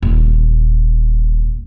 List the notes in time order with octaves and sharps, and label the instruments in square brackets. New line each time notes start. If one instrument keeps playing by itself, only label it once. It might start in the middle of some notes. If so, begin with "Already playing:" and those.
[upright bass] D#1 D3